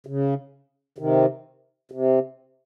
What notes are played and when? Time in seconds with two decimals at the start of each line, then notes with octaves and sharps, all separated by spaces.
0.06 C#3
0.98 C3 D#3
1.92 C3